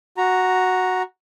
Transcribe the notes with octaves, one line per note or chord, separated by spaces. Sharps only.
F#4 A#5